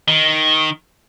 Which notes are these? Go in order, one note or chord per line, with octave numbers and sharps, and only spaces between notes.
D#3